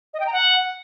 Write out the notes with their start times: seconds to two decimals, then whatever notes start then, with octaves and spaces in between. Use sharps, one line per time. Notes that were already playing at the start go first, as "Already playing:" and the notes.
0.14 D#5
0.20 G5
0.26 A#5
0.33 F#5